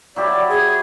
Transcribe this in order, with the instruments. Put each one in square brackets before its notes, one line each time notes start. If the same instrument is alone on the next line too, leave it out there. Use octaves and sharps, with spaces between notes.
[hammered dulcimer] F#3 E4 G4 [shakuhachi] D5
[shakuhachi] G#4